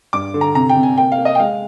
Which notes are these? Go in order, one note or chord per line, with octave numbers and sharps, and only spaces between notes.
G2 D6
D3
A#5
C3 A#5
G5
C3
G#5
A#3 G5
F5
A#3
D#5
G5
G#3 F5